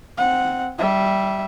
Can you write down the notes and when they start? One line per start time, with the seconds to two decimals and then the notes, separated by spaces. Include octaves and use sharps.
0.17 C4 F#5
0.78 G3 E5